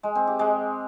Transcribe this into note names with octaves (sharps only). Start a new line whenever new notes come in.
G#3
C4
G4
G#3